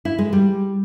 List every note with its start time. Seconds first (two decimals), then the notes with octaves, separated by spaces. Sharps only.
0.05 E4
0.18 G#3
0.33 G3